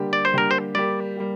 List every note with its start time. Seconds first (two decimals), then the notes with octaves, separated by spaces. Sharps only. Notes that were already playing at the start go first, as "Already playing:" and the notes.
Already playing: D3 G3 A#3 G4
0.13 D5
0.25 C5
0.33 D3 G3 A#3 G4 A#4
0.51 C5
0.75 G3 A#3 G4 D5
1.16 G3 A#3 G4